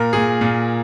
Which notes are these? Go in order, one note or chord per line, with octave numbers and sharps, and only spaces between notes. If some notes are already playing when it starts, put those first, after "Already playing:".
Already playing: A#2 A#4
A#2 G#4
A#2